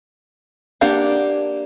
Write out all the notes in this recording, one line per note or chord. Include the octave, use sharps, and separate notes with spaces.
A#3 D4 G4 F5 F#5